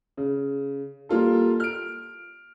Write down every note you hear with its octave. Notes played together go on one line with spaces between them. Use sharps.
C#3
G3 A#3 F4 A4
F6 D7